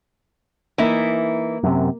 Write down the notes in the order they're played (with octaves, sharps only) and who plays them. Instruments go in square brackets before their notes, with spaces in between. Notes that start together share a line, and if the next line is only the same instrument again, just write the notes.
[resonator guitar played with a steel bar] E3 D#4 E4 [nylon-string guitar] A#3
[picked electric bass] F#2 C3